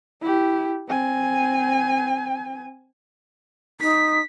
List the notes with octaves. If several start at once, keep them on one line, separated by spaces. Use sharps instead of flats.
E4 G4
C4 G#5
D#4 B6